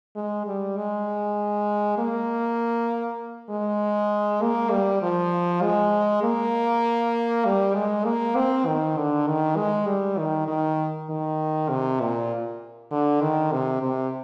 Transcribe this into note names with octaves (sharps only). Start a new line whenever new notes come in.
G#3
G3
G#3
A#3
G#3
A#3
G3
F3
G#3
A#3
G3
G#3
A#3
C4
D#3
D3
D#3
G#3
G3
D#3
D#3
D#3
C3
A#2
D3
D#3
C3
C3